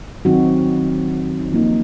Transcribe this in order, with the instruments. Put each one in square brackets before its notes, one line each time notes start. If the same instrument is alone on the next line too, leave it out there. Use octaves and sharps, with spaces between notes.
[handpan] D#3 F#3 C4 D#4 F#4
D#4
F3 A#3 D#4 F4